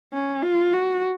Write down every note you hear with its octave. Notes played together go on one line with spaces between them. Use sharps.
C#4
F4
F#4